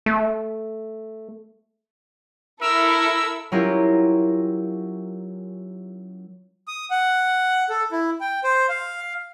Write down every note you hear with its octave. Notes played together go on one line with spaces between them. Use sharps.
A3
E4 A4 A#4 E6
F#3 C#4 E4 F4 G4 A#4
D#6
F#5
A4
E4
G5
C5
F5